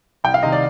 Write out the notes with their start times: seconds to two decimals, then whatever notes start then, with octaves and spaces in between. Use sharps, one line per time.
0.24 C2 G5
0.34 F5
0.43 C3 D#3 D#5
0.52 D5